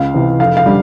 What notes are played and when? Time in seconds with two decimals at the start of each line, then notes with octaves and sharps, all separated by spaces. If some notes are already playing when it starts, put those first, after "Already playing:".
Already playing: C#2 F5
0.14 C3 E3
0.40 F1 F5
0.57 F5
0.66 D3 G3